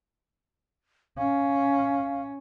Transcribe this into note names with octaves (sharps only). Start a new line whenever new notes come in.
C#4 F5